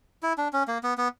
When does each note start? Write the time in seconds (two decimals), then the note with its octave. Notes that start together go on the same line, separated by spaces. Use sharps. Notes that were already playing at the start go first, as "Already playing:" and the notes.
0.23 E4
0.38 D4
0.53 C#4
0.68 A#3
0.83 B3
0.98 B3